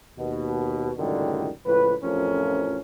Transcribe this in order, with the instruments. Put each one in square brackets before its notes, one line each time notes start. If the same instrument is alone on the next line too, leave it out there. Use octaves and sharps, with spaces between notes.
[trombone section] D#2 B2
C#2 F#2 A2 D3 D#3 G3
C#2 A2 F3 B4
A1 F2 A2 F3 C#4 A#4